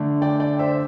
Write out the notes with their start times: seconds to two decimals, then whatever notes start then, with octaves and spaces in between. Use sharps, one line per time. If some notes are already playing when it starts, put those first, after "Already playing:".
Already playing: D3 A3 D4
0.22 D5 G5
0.40 D5 G5
0.59 C5 E5